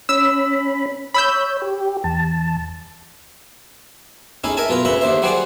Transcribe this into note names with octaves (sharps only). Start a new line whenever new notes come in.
C#4 B5 E6
C#5 B5 E6 G6
G4
E2 A5
A3 C#4 D#4 E4 G#4
A#4 D#5 E5 G#5 A5
B1 F4 B4 A#5
D2 C#3 E5 A#5 B5
D#2 D3 C5 E5
F#3 G3 F#4 G#4 C5 D5